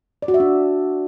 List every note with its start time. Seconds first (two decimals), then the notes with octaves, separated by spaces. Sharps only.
0.22 D5
0.28 F#4
0.34 E5
0.40 D4